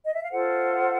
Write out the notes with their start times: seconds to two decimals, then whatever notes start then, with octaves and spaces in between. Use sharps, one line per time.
0.06 D#5
0.14 E5
0.23 F5
0.31 F4 A4 C5 F#5